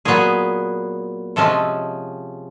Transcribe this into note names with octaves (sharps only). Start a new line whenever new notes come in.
A#2 F#3 B3 G#4
C3 F3 G#3 C#4 A4